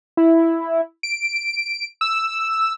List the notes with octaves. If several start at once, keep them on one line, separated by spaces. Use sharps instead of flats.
E4
D7
E6